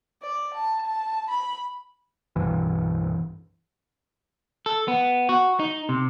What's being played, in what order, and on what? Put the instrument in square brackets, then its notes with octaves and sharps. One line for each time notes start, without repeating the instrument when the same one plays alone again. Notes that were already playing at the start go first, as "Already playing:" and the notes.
[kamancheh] D5
A5
A5
B5
[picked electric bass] C2 G2 B2 E3
[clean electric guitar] A4
B3
F#4
D#4
C3